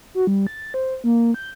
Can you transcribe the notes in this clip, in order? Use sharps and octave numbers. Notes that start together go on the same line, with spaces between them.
F#4
G3
A6
C5
A#3
G6